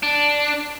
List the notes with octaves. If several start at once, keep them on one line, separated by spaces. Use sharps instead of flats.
D4